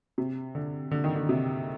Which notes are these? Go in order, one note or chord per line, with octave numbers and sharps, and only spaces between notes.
C3
D3
D3
D#3
D3
C3